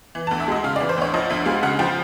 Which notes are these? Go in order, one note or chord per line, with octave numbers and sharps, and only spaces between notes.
E3
A5
D2
E5
G#3 D#5
C#3 F5
D5
E3
C5
D2 C#5
F3 D#5
D2 E5
G#3 F5
C#3 F#5
F3 G5